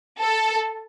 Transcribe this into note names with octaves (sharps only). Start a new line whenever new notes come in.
A4